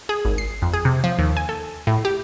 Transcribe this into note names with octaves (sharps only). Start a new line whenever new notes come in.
G#4
G#1
C7
F2
G#4
C3
F3
D#2
G#5
A4
A2
G4